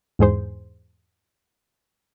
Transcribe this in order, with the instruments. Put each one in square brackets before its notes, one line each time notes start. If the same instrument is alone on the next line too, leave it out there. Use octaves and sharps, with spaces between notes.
[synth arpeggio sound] E2 G#2 G#4 C5